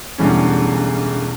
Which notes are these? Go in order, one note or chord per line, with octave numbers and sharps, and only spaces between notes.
E1 E2 D3 G3 C#4